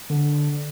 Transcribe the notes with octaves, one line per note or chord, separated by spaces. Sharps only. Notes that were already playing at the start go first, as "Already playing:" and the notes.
D3